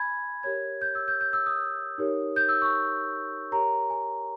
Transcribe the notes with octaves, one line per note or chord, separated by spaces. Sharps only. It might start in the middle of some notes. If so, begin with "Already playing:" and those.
Already playing: G#5 B5 G#6
G4 A#4 C#5 G#6
G6
E6
G6
G6
E6
D#6
D#4 G4 A#4 C#5
G6
E6
C#6
G4 A#4 C#5 A#5
G#5